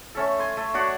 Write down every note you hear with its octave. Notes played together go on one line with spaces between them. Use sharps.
A3 C#4 A4
G#5 C6
A3
D4 F#4 C#5 F#5